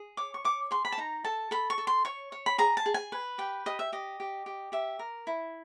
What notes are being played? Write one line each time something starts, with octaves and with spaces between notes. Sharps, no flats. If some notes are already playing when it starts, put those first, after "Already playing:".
Already playing: G#4
C#5 D6
C#6
C#5 D6
G#4 C6
B5
A5
D#4 A#5
A4 A5
A4 B5
C#6
A4
C6
C#5 C#6
C#5
B5
G#4 A#5
A5
G#4
G#5
B4
G4 G5
G4 D#5
E5
G4 D#5
G4
G4
G4 E5
A#4
E4